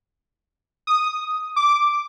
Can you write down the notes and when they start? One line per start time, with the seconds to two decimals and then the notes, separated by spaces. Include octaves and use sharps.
0.87 D#6
1.56 D6